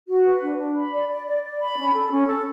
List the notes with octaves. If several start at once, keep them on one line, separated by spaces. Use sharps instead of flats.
F#4
B4
D4
D4
B5
D5
D5
D5
D5
B5
C#4
A4
C#4
A4